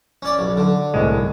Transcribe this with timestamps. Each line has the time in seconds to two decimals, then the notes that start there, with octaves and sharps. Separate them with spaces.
0.22 C#4 D5
0.39 B1
0.57 D3
0.94 C2 A2 G#3